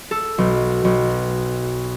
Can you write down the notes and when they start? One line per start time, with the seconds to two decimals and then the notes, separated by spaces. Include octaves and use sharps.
0.11 A4
0.38 B1
0.85 B1